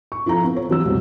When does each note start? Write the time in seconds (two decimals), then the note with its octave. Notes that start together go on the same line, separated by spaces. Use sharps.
0.12 C#6
0.26 F3 E4 A4 A#5
0.44 B3
0.56 C#5
0.69 E3 F#3 E6
0.85 C2 F2 B2